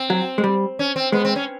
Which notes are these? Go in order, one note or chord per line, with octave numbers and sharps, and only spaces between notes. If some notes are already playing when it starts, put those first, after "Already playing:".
Already playing: C4
F#3
G#3
G3
C#4
C4
G#3 B3
C4
C#4